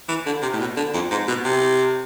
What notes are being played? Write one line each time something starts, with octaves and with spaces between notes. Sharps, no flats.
E3
D3
C3
A2
B2
D3
F2
G#2
B2
C3